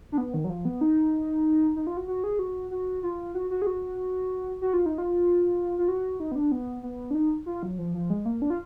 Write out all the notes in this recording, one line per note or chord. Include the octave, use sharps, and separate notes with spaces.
D4
B3
D#3
F#3
F3
B3
D#4
D#4
F4
F#4
F#4
G#4
F#4
F#4
F4
F#4
F#4
G#4
F#4
F#4
F4
D#4
F4
F4
F#4
D#4
B3
D4
B3
B3
D4
D#4
F4
F#3
F3
F3
G#3
A#3
D4
F4